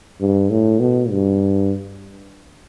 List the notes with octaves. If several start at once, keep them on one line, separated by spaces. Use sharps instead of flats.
G2
A2
B2
G2